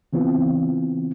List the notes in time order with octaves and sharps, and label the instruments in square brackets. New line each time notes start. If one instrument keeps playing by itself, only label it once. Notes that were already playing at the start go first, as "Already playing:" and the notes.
[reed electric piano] C#3 E3 B3 C4 F4